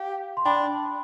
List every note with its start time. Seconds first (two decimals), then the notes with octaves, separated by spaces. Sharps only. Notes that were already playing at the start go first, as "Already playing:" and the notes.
Already playing: G4 F5
0.37 C6
0.45 D4 G5 B5